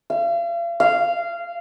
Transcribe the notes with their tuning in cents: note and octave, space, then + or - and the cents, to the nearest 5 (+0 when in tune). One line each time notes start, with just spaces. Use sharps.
F5 -40
F5 -15